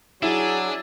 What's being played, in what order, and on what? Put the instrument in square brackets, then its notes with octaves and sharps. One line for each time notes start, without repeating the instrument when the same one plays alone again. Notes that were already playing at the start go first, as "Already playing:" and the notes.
[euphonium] F#3 [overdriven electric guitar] D4 [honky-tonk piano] E4 [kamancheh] G#4